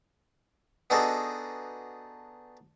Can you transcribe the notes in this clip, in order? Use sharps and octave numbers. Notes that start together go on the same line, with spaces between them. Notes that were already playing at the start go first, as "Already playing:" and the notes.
B3 D4 D#4 F#4 G#4 A4